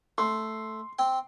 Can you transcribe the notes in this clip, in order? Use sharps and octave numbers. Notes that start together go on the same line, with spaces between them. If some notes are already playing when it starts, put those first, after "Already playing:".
A3 C6
C4 G5